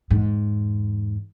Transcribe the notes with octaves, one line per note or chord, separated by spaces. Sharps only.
E2 G#2